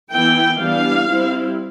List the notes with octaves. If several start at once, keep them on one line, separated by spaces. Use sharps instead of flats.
E3 B3 E4 G5
E3 G3 B3 D4 F5
G3 C4 E4